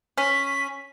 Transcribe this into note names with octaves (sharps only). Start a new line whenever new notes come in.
C#4 B6